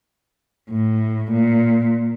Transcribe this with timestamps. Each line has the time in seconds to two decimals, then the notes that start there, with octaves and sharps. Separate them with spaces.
0.70 A2
1.32 A#2